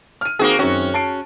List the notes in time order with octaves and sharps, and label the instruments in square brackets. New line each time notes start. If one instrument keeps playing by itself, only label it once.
[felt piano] F6 D#7
[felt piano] D#3 C4 [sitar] A#3 F#4 G#4
[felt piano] F#2 D#3 C4 [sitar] C#4 F#4
[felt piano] A5 C7 D7